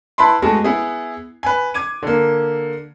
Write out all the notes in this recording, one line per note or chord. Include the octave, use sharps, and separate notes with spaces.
E4 B4 A5 B5 C6
G#3 A3 B3 F#4 A5
B3 E4 G#4
B4 G#5
D6 G#6 D#7
D3 A#3